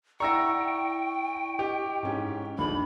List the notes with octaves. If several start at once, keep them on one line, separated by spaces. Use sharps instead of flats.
E4 D5 F#5 G5 A#5 C#6 E6 A#6
G4 D#5
G#2 C#4
A#1 D#2 D3 B5